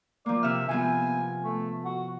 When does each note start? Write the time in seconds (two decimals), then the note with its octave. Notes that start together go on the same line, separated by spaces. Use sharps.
0.26 F3 A#3 D5
0.43 C3 E5 E6 F6
0.69 C3 F3 B3 G#5
1.44 A3
1.85 F#4